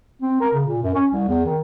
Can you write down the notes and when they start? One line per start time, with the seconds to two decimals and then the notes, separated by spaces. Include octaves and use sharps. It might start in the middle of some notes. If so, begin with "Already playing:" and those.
0.22 C4
0.41 A#4
0.53 C#3
0.67 A#2
0.83 F#2
0.95 C#4
1.12 C2
1.28 E2
1.46 D#3